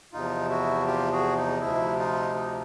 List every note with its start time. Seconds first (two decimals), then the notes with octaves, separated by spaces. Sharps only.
0.13 E2 C3 F3 D#4 F4
0.49 E4 F#4
0.86 F4 G4
1.11 F#4 G#4
1.37 D#4
1.61 D2 C3 F3 E4
1.98 D#4 F4
2.35 D#4